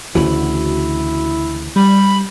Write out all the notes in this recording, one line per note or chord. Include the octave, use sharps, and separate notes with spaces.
D2 C#3 E3 E4 F#4
G3 B5